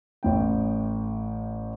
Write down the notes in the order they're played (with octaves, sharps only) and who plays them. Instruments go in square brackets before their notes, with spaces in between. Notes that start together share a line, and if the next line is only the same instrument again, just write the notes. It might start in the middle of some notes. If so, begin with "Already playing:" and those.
[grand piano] A1 A2 G5